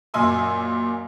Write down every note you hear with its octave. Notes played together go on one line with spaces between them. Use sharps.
F#2 A#2 D#5 G#5 C6 E6